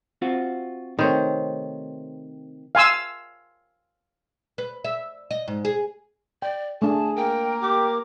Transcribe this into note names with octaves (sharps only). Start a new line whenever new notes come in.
C4 F4 F#4
C3 D#3 A3 C5 C#5
F5 G#5 C6 E6
B4
E5
D#5
G#2
G#4
D5 G5
A3 D4 G#4 A5
A#3 A#4 G5
G4 D6